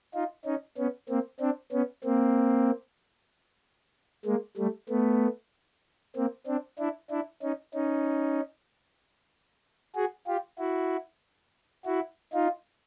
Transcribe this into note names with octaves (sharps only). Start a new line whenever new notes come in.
D#4 F4
C#4 D#4
B3 C#4
A#3 C4
C4 D4
B3 C#4
A#3 C4
G#3 A#3
G3 A3
A3 B3
A#3 C4
C4 D4
D4 E4
D4 E4
C#4 D#4
C#4 D#4
F#4 G#4
F4 G4
E4 F#4
E4 F#4
D#4 F4